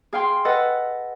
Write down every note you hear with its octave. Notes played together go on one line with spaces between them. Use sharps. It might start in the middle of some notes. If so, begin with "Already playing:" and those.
G#4 F5 G5 C6
A4 B4 D#5 F#5